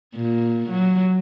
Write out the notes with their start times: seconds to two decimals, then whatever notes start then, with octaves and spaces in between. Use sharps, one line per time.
0.15 A#2
0.70 F#3